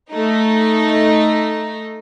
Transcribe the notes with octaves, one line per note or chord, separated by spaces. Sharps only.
A3 D#4